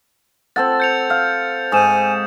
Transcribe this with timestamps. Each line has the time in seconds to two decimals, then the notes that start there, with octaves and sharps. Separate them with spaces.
0.56 C4 A4 F#5 A6
0.80 G6 C#7 F7
1.10 F5
1.72 G#2 G#5 D#6 E7